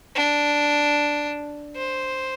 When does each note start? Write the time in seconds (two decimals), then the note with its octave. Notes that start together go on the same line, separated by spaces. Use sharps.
0.15 D4
1.76 C5